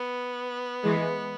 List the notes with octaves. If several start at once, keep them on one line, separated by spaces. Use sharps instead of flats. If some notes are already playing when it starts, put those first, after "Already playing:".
Already playing: B3
E3 G#3